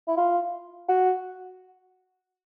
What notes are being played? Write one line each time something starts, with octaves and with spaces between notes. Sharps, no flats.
E4
F4
F#4